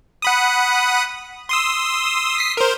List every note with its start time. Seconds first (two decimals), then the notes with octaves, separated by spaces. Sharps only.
0.22 F#5 B5 D#6
1.49 C6 D#6 E6
2.36 D#6 B6 C7
2.57 A#4 C5